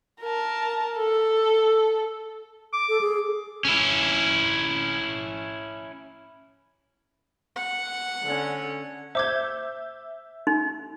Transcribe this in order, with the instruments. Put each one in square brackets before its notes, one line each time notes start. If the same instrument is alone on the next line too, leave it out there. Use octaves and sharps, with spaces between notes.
[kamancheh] A#4 A5
A4
[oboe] D6
[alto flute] A4
G#4
[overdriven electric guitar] C#4 E4
[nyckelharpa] F#5
[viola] D3 C#4
[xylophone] C5 D6 G#6 [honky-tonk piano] E5 G6
[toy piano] D#4